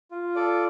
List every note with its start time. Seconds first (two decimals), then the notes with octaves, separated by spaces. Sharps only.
0.11 F4
0.35 A4 D5